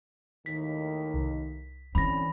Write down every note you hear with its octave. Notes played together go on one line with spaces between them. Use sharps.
D#2 A2 D#3 B6
C2
D3 E3 C4 C#4 B5 A#6